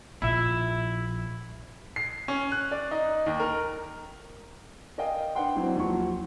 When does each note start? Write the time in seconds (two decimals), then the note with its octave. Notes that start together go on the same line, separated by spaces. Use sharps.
0.22 A#1 E4 E5
1.96 C7
2.28 C#4
2.52 F#6
2.71 D5
2.91 D#4
3.26 D#2
3.40 A#4
4.98 A#4 D5 D#5 F5 G5 G#5
5.35 D4 B4 F#5 G5 C6
5.55 E3 F#3 C4
5.76 D#2 F3 F#3 C#6